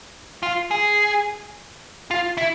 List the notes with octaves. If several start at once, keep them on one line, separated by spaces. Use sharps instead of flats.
F4
G#4
F4
E4